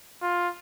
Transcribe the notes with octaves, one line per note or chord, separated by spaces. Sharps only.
F4